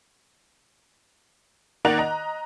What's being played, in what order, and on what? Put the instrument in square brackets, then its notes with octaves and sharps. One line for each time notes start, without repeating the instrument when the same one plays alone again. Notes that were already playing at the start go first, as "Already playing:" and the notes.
[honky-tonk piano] D#3 A#3 D5 F#5 F#6 F7
D#5 A#5